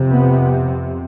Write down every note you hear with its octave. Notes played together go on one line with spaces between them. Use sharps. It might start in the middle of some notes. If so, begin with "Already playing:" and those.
Already playing: F2 C3
B3